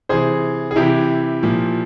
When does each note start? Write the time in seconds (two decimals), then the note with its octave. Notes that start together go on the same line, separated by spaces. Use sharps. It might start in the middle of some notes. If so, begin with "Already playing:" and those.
0.09 C3 E3 G#4 C5
0.71 G#4
0.76 C3 E3 E4 G4
1.43 A#2 F3